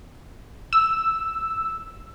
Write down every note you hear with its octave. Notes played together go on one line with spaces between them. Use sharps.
E6